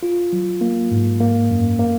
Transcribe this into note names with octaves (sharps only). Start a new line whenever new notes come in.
F4
F#3
A#3
G#2
A#3
F#2
A#3